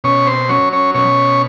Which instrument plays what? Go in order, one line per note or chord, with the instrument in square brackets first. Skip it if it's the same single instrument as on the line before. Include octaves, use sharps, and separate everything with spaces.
[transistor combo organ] B2 C#4 C#5
C4 C5
F#3 C#4 C#5
C#4 C#5
B2 C#4 C#5